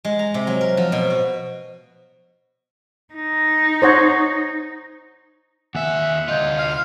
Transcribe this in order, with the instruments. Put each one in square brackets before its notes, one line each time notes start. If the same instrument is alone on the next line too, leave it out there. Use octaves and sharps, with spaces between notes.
[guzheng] G#3
A#5
C3
F#3
A#4
F3
B2
F#4
[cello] D#4
[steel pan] C5 C#5 F#5
[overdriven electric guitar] D#2 E5 [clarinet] F#5 [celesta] G#5
[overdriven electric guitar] D2 F4 [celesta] D#5 G6 G#6
[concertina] F5